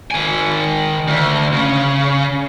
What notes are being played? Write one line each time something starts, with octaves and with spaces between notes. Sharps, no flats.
D#3 G#5
D2
C#3